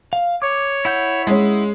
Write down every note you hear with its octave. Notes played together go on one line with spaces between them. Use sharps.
F5
C#5 D6
E4 F#5 G6
G#3 C#4